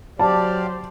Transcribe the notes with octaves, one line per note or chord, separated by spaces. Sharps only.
F#3 G4 C5 D5 F5 A5